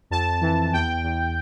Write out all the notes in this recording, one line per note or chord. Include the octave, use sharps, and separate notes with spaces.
F2 A5
E3
E2 G5
E2